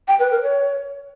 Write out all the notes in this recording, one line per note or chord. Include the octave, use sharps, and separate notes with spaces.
G5
B4
A#4
C#5